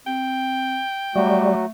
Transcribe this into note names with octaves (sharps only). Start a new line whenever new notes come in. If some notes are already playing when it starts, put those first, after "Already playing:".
C4 G5
F#3 G3 A3 F#4